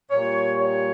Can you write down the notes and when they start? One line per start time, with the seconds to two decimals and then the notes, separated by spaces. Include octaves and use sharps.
0.11 A#2 G3 C#5
0.58 C#5